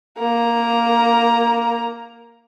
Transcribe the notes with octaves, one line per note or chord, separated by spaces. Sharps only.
A#3 A#5